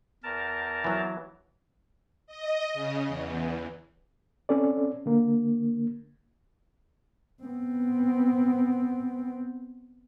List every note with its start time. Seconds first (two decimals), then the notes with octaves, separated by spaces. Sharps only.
0.23 E2 A#4 A5
0.84 E3 F#3
2.27 D#5
2.73 C#3
3.07 E2
4.49 C4 C#4 A4 D5
5.06 D3 A#3
7.43 B3 C4